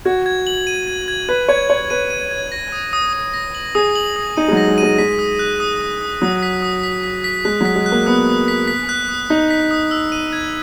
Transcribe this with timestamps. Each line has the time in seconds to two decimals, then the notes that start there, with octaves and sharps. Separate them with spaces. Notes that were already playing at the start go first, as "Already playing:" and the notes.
0.05 F#4 G#6
0.26 G#6
0.47 F#7
0.67 D#7
0.87 G#6
1.08 G#6
1.29 B4 G#6
1.48 C#5 G#6
1.69 C#5 F#7
1.90 B4 D#7
2.10 D#7
2.31 G#6
2.52 A#6
2.72 D#6
2.93 D#6
3.13 D#6
3.34 A#6
3.55 F#7
3.75 G#4 D#6
3.95 F#7
4.16 D#6
4.37 D#4 D#7
4.48 G#3
4.52 F#3
4.57 A#6
4.68 G#3
4.78 D#7
4.83 G#3
4.98 G#3 B6
5.19 D#6
5.39 F#6
5.60 D#6
5.81 D#6
6.01 D#6
6.22 F#3 D#6
6.43 B6
6.62 D#6
6.83 B6
7.04 B6
7.24 B6
7.45 G#3 F#6
7.61 F#3 B6
7.76 G#3
7.86 F#6
7.92 A#3
8.06 B3 D#6
8.27 D#6
8.48 B6
8.68 B6
8.89 F#6
9.09 D#6
9.30 D#4 B6
9.50 B6
9.71 D#6
9.91 E6
10.12 D#7
10.33 G#6